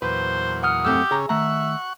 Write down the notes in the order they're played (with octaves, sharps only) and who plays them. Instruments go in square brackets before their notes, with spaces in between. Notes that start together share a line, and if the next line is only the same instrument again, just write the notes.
[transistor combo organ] E2 A#2 F#3 [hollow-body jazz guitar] B4 [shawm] C5
[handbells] F#5 D#6 F6
[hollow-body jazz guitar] F#2 A3 C4 [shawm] G4 [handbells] E6
[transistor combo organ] C#3 C#4 [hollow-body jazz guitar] G#4 A#5
[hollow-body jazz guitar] D#3 A3 A#5 [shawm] E5 [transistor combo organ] F#5 C#6